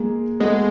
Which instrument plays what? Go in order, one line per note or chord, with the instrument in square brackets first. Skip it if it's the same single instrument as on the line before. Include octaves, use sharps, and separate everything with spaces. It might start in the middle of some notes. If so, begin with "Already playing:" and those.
Already playing: [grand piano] G#3 A#3
[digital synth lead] G#3 [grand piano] A3 B3